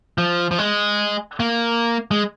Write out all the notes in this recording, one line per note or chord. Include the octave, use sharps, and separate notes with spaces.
F3
F3
G#3
A#3
G#3